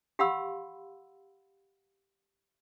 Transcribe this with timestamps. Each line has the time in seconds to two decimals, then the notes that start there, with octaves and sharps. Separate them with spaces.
0.19 G4 F5 F#5 B5 C6 E6